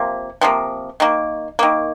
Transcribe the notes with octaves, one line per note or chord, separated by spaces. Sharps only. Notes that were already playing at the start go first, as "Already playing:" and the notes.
Already playing: C3 F3 A#3
C3 F3 A#3
D#3 A#3
D#3 A#3